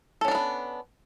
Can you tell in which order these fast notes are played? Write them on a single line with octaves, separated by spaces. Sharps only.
A4 C#4 D4 A#4 B3